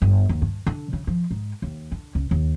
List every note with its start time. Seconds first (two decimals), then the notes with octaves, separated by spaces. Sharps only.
0.02 G1
0.29 D#2
0.42 G2
0.67 D3
0.93 C#3
1.07 F3
1.31 G#2
1.62 D#2
1.92 D3
2.15 C#2
2.31 D#2